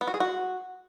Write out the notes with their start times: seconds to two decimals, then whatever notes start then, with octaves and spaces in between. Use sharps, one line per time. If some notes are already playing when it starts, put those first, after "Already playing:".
0.01 B3
0.07 F#4
0.14 G#4
0.20 F#4